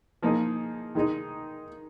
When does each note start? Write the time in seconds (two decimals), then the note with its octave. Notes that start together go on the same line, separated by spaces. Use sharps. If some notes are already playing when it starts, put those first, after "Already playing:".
0.22 F3 A#3 D#4 G#4
0.95 D#3 G#3 D#4